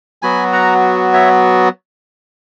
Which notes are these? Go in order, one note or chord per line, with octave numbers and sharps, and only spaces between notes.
F#3 B3 F#4 G#5 B5
F#5 A#5
C#5 E5